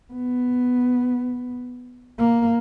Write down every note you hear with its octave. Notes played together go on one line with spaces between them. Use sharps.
B3
A#3